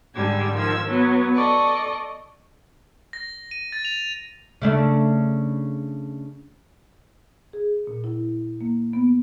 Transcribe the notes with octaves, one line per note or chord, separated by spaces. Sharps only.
G#2 D3 G3 E6 G#6
D#3 F3 E6 G#6
F#3 B3
A4 D5 D#5 C#6
A#6
D#7
A6
F7
C#3 A3 D4
G#4
A#2
E4
A#3
B3